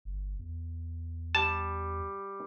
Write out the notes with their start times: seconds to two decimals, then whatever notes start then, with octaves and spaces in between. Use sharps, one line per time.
0.05 G1
0.39 E2
1.35 G3 A5